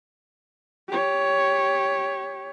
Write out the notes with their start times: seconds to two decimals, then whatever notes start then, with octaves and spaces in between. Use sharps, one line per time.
0.89 G4 C#5